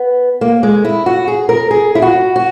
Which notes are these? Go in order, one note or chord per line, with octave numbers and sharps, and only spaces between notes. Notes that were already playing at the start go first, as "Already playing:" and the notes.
Already playing: B3
A#3
G#3
E4
F#4
G#4
A#4
G#4
E4
F#4
F#4